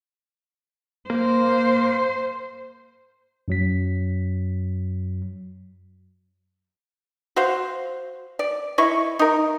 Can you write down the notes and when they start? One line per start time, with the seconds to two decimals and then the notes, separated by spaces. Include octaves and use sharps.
1.10 A#3 C5
3.48 F#2 F#3 B6
7.36 F#4 C5 F5
8.39 D5
8.78 E4 D#5 C#6
9.19 D#4 A#4